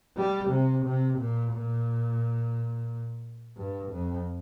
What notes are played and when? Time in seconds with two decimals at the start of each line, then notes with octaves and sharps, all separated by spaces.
0.17 G3
0.51 C3
0.85 C3
1.19 A#2
1.53 A#2
3.57 G2
3.91 F2